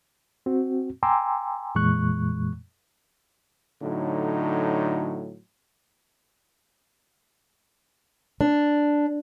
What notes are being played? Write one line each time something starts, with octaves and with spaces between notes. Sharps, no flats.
C4 F#4
G5 G#5 A#5 C6 D6 E6
F2 A#2 E3 G#3 C#6 F#6
A2 D3 F#3 D#4
D4